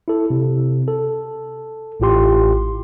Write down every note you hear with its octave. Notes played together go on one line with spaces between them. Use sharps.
E4 A4
C3
A4
A1 A2 F4 G4 C6